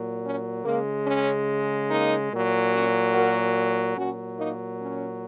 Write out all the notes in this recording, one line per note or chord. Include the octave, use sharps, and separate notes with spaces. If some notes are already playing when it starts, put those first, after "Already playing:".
Already playing: A#2 F#3
C#4
C#3 G#3 A#3
C#4
A#3 D#4
A#2 F#3
C#4 F#4
F#4 A#4
A#2 F#3 C#4 F#4
A#3 D#4
C#4